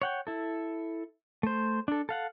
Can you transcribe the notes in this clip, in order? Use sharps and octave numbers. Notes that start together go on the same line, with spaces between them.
C#5 F#5 G5
E4 A4
A3 C5
D4 A4
A4 F5 F#5